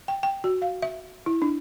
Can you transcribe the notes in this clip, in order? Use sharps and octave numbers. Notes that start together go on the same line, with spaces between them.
G5
G5
F#4
F5
E5
E4
D4